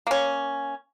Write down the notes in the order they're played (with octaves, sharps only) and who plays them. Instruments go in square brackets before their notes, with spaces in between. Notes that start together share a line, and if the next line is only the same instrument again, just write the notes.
[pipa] A#3 C#4